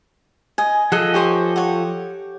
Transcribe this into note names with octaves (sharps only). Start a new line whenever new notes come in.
D#5 G#5
F3 G#4 A4 D#5 F#5
G4 C5 C#5 G#5
C#5 F#5